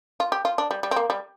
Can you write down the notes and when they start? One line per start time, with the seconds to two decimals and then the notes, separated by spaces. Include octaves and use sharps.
0.20 F4
0.32 G4
0.45 F4
0.58 D4
0.71 G3
0.83 G3
0.91 C4
0.96 A#3
1.10 G3